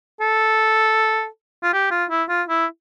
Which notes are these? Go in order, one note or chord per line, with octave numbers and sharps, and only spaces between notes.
A4
F4
G4
F4
E4
F4
E4